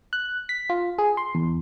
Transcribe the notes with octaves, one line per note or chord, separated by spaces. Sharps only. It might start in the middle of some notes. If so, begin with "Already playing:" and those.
F#6
B6
F4
G#4
C6
E2